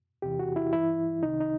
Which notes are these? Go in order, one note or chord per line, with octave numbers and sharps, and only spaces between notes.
E2 C3 E3 G4
F#4
E4
G2 E3 E4
C2 C3 D#3 D#4
D#4